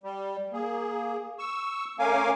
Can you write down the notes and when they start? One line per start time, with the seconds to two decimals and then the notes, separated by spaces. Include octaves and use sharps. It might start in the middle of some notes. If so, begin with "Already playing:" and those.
0.03 G3
0.53 A#3 G#4
1.39 C#6 E6
1.99 A3 C#4 A#4 F5 G#5 D6